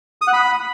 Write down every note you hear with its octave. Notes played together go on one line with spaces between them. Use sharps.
D#6
F#5
B5